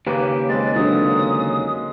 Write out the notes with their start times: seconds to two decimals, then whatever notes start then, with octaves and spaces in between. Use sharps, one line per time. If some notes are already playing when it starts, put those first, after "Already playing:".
0.07 D#2 C#3 A#3 G4 B4 C#5
0.49 G#3 C4 B4 A6
0.76 D3 F#3 D#6